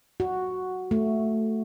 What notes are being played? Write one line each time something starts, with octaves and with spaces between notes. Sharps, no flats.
F#4
A3